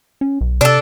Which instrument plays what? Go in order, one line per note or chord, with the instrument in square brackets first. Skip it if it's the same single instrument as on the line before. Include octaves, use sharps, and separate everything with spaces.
[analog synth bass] C#4
B1
[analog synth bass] C3 [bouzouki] D4 A4